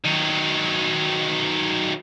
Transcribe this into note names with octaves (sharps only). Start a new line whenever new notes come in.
D#3 F#3